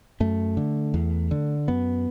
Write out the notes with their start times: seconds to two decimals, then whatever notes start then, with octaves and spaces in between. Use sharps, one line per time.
0.20 F#2 A3
0.57 D3
0.94 E2
1.31 D3
1.68 F#2 B3